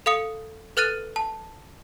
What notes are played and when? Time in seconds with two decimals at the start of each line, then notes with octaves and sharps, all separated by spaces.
0.06 A4 F5 D#6 C#7
0.77 A4 B4 F6 F#6 A6 D#7
1.16 A5